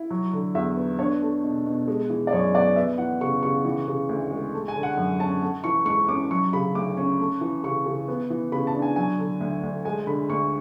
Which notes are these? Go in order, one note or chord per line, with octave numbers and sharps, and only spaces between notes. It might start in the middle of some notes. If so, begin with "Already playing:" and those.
Already playing: E4
F#3
D3
E2 E5
B3
D4 C#5
A3
B2
B2
G#3
E3
D5
F#2 C#5
B3 D5
B3 E5
E3 F#5
C#3 C#6
C#3 C#6
E3
C#3
D2
G#3
A3
G#5
D3
F#5
F#2
C#4 A5
A3
E3 C#6
G#2 C#6
C#4 D6
F#3 C#6
C#3 B5
D2 D6
C#4
A3
E3
C#3 C#6
C#3
B3
E3
C#3 B5
A5
D4
G#5
F#3 G#5
D3
D2
D2
G#3 G#5
D3 B5
D2 C#6